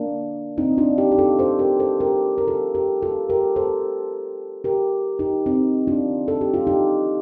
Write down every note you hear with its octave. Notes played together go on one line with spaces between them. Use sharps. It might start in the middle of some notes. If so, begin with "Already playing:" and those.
Already playing: A#3 D4
C4 D#4
D4 F4
D#4 G4
G4
F4 A4
A4 C5
G4 A#4
A4 C5
G4 A#4
A#4
F4 A4
G4 A#4
F4 A4
G4 A#4
A4 C5
G4 A#4
D#4 G4
C4 D#4
D4 F4
A4
G4
F4
D#4 G4